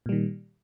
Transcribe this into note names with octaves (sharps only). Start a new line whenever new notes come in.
A#2 D#3 G3